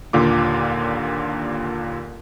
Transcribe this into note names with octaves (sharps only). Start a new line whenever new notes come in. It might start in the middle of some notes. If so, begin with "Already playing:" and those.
D#2 A#2 D3 F4 D6